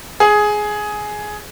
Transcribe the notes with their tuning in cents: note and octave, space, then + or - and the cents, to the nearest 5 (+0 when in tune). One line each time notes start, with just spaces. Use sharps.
G#4 +10